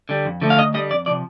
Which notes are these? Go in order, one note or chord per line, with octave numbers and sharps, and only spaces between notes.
D3 G3
F2
D3 F3 A3
F5
D2 D#5
D3 G3 D#5
F2 D5
C3 F3 D5